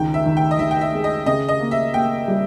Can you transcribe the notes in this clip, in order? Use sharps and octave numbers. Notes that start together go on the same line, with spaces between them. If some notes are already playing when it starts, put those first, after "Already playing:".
Already playing: C#2 D#3 G5
E5
D#3
G5
D#5
D#3 E5
G5
E5
G#3
D#5
C#3 D#5
D#5
A#3
E5
A#3 G5
G3